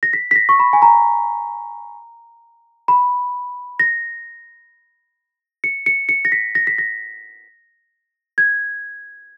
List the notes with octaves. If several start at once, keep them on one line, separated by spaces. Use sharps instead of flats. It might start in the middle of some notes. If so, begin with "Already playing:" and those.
A#6
B6
B6
A#6
C#6
B5
G#5
A#5
B5
A#6
C#7
C#7
C#7
A#6
B6
A#6
B6
A#6
G#6